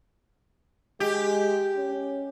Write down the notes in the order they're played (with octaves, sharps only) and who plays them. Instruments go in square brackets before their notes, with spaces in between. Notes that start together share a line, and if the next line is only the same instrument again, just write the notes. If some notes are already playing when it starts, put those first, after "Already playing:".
[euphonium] G#3 [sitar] G4
[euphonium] C#4